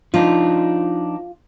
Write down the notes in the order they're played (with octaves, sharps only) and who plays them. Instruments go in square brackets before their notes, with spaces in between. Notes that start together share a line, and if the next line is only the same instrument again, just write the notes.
[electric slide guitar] F3 D4 D#4 [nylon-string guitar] F4